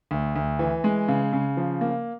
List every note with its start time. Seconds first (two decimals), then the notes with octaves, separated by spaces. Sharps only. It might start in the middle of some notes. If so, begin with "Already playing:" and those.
0.11 D2
0.36 D2
0.59 E3
0.84 G#3
1.08 C#3
1.33 C#3
1.57 F3
1.81 A#3